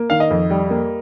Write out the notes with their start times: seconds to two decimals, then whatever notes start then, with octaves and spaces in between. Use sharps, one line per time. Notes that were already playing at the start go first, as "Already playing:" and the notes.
Already playing: A#3
0.10 D#3 F5
0.20 D#5
0.31 F2
0.50 G3
0.70 A#3